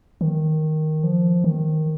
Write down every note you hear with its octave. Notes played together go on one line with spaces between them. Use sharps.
D#3
F3
D#3